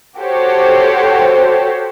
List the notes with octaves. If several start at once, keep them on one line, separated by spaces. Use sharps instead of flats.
F#4 G4 A4 C5 C#5